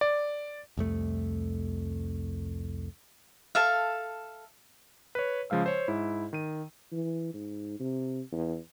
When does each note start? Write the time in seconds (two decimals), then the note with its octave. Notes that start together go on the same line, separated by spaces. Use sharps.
0.01 D5
0.77 C2 F2 A3
3.55 A4 E5 F5
5.15 B4 C#5
5.50 C#3 F3 G#3 F5 E6
5.66 C5 C#5
5.88 G#2 E4
6.33 D#3 D#7
6.92 E3
7.34 G#2
7.79 C3
8.32 E2